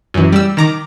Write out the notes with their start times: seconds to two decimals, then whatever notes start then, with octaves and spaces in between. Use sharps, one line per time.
0.14 F#2 E3
0.32 G3 E6
0.57 D#3 A#5 D6